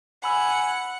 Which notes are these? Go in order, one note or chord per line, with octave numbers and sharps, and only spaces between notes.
F#5 G#5 B5 E6